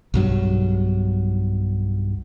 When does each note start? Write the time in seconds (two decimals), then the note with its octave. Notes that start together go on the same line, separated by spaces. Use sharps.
0.14 B1 G2 F#3